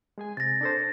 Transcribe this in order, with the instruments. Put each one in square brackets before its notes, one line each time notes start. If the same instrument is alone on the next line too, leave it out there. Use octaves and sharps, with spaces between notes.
[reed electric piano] G#3 G#4 G#5
[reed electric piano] C3 [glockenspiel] A6 A#6
[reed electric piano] D4 A4 C5